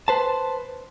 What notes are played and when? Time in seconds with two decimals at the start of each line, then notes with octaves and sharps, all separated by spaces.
0.08 B4 C5 A5